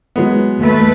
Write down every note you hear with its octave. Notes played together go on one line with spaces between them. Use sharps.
F#3 G#3 B3
D#2 A3 B4